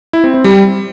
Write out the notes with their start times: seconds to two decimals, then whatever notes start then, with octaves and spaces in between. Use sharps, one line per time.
0.13 E4
0.24 C4
0.34 C4
0.44 G3